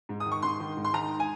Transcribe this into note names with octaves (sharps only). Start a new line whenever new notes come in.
G#2
D#6
D#3
C#6
G#2 C6
D#3
G#2
C6
D#3 A#5
G#5